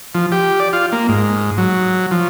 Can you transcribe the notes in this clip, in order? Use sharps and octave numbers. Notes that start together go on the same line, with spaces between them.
F3
G4
D5
F4
A#3
G#2
F#3
F3